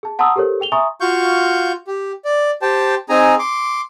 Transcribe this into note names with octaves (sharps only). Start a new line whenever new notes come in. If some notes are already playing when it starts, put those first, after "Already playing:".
G#4 A5
F#5 A5 A#5 C6 D#6 E6
G4 A4 A#4 C5 C#5
G#4 G5 F7 G7
E5 G#5 A#5 C6 C#6 D#6
F4 F#4 F5 C#6 G6
G4
D5
G4 C5 G5 A5
C4 D#4 G#4 G#5 A#5
C6 D6